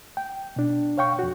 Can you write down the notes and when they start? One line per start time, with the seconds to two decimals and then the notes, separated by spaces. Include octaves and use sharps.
0.17 G5
0.56 B2 D4
0.98 C#5 F5 G5 C#6
1.19 F2 F#4